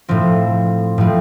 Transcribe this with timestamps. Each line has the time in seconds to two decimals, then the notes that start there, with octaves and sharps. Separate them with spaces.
0.08 A2 F3 C4
0.98 A2 F3 C4